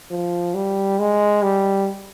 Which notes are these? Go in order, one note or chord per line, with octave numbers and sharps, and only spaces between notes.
F3
G3
G#3
G3